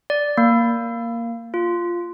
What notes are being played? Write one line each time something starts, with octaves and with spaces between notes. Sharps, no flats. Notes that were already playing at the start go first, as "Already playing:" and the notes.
D5
A#3
F4